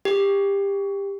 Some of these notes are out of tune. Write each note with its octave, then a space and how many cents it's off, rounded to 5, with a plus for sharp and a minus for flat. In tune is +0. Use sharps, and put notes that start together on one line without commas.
G4 +20